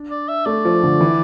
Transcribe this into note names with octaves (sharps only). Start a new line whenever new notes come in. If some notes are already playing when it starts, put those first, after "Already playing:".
Already playing: D4
D5
E5
A3 D5
F3
D3
E3